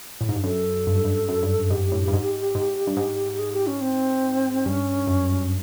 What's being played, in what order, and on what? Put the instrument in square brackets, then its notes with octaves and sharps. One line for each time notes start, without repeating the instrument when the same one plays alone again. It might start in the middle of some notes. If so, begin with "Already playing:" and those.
[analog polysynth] A2
G#2
G2
[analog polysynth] F#2 [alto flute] A4
[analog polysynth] G2
F#2
G2
F#2
G2
[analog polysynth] G#2 [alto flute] G4
[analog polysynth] A2
G2
G#2
G#2
G2
G#2
[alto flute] G#4
G4
C#4
C4
[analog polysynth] G2 [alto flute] C#4
[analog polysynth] F#2